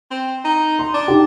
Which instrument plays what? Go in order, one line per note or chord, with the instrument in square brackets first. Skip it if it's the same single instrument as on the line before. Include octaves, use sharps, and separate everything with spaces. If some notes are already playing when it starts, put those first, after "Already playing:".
[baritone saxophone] C4
D#4
[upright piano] C6
[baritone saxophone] D4
[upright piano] D#4 G4